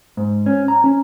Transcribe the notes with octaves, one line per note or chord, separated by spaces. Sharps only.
G#2
C#4
A#5
C#4